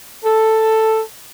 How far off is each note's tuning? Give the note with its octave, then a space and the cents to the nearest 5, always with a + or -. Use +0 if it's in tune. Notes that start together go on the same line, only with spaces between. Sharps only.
A4 +5